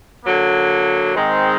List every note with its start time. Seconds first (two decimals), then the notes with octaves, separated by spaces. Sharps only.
0.25 D3 F#3 A#3
1.15 G#2 D#3 G#3 C4 D#4